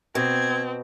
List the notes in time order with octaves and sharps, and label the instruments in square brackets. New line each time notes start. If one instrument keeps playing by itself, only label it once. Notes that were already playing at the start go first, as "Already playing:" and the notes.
[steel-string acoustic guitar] B2 [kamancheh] C4 [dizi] G#6